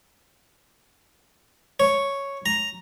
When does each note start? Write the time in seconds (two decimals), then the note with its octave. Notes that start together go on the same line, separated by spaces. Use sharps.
1.80 C#5
2.46 A#5